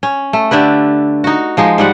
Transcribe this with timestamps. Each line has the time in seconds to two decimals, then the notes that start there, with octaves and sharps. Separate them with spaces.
0.03 C#4
0.33 A3
0.51 D3 D4 G4 B4
1.24 D#4 F#4
1.57 F3 G#3 D#4
1.78 G#2 G3 F#5